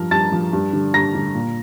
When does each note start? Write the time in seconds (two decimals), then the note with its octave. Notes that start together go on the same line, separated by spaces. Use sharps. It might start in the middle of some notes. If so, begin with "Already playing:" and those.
Already playing: G2 F3 A#4 A#5
0.11 G2 A5 A6
0.32 F3
0.53 G2
0.73 D3 G3
0.94 G2 A#5 A#6
1.15 D3 G3
1.35 A#2